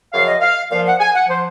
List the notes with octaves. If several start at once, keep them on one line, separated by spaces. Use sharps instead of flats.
F#2 C#3 F3 F5
D#5
F5
A#2 F3 F5
F#5
G#5
F#5
F3 C5